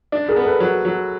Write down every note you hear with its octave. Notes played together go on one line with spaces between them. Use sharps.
D4
G#4 A#4
B3
A4 B4
F#3
F#3